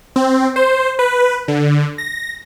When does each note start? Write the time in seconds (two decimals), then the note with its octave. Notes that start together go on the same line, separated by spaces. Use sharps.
0.16 C4
0.56 C5
0.99 B4
1.48 D3
1.98 A#6